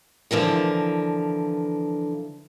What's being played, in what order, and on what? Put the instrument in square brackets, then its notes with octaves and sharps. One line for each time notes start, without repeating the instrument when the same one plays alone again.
[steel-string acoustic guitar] D3 E3 F3 A#4